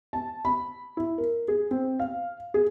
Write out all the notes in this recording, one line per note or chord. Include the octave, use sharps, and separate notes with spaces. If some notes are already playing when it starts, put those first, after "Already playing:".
A5
B5
E4
A#4
G#4
C4
F5
G#4